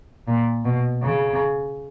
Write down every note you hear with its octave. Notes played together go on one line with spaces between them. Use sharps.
A#2
B2
C#3